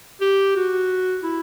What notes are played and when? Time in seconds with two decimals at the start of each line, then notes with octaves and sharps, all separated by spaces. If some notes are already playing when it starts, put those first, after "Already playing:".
0.21 G4
0.56 F#4
1.24 E4